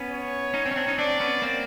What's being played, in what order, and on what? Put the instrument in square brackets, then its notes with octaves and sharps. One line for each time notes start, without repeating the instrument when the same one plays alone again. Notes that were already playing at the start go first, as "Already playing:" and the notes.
Already playing: [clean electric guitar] B3 C#4
[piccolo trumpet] C#5
[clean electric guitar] C#4 D#4
C4 D4
C#4
C4 D4
C#4 D#4
[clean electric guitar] C4 D4 [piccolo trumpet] D5
[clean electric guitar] B3 C#4
A#3 C4